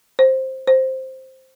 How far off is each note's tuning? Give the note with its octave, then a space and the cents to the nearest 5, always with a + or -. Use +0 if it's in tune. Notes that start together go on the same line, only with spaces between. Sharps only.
C5 +10
C5 +5